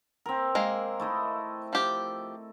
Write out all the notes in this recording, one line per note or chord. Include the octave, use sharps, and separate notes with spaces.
C4 A#4
G#3 A#3
A3 E4 D#5
F3 G4